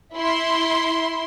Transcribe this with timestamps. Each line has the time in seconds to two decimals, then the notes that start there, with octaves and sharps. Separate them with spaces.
0.16 E4 C6